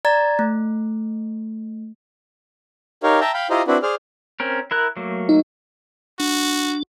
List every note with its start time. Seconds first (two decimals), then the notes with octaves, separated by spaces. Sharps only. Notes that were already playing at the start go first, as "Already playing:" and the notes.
0.05 D5 A#5 G#6 A6
0.39 A3
3.03 D#4 G4 A#4 C#5 F5
3.21 E5 G5 A5 A#5
3.34 F5 G5 B5
3.50 E4 F4 G4 C5 D#5 A#5
3.68 C4 D4 E4 F#4 B4
3.83 G#4 C5 D5 F6
4.40 C4 C#4 A#4
4.71 E4 A#4 F#6
4.97 F#3 A3 A#3
5.29 D#4
6.20 D4 F#4